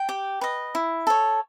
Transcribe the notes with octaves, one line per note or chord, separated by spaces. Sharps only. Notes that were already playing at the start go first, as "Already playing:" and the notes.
Already playing: G5
G4
B4 D#5
E4
A4 C#5